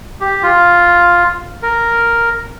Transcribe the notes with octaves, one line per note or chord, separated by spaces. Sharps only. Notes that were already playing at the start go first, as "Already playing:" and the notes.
G4
F4
A#4